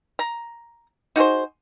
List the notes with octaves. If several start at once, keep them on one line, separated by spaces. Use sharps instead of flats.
A#5
D#4 F#4 G#4 C5